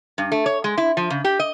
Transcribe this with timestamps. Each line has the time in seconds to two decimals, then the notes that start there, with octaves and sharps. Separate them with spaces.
0.18 G2
0.32 A3
0.46 C#5
0.64 G#3
0.77 E4
0.97 F3
1.10 C#3
1.24 G4
1.39 D#5